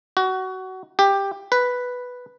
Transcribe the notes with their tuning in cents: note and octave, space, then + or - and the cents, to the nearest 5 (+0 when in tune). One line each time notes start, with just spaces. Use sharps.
F#4 +20
G4 +10
B4 +0